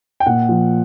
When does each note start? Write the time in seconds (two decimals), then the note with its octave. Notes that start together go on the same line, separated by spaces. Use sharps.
0.20 G5
0.26 A#2 F#5
0.49 F3